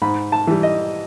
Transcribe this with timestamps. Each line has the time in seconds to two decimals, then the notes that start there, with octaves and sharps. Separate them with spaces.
0.02 G#2 B5
0.32 A5
0.47 E3 G3
0.63 D#5